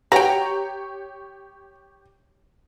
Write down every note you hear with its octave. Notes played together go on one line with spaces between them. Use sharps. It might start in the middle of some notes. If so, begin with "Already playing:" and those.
F#4 G4 B4 C#5 G5 A#5